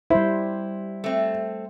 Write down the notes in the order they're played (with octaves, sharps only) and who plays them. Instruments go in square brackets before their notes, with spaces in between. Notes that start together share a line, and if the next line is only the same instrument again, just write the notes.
[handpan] G3 C5 [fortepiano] E4
[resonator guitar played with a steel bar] A3 C4